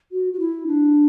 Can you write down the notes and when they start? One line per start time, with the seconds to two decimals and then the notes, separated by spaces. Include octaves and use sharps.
0.12 F#4
0.33 F#4
0.40 E4
0.67 D4